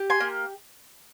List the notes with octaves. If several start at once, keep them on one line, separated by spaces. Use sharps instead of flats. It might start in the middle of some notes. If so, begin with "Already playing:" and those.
Already playing: G4
G#5 C6
A#3